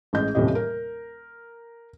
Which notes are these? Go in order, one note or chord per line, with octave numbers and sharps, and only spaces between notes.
A1 G#3 D#5 G6
D#1 A1 A2 C3 G4 D#5
A#4